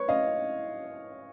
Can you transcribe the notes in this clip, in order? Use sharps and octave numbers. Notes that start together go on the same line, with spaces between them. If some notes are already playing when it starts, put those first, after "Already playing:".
Already playing: B4 C#5
D#5 F5